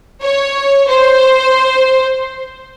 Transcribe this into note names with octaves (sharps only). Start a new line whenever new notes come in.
C#5
C5